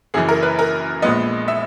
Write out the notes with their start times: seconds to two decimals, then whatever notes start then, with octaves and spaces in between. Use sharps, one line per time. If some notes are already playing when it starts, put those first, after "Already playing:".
0.14 F#1 F#2 E3 G#4
0.29 A#4
0.43 B4
0.59 A#4
1.02 A#1 A#2 G#3 B3 D#5
1.48 E5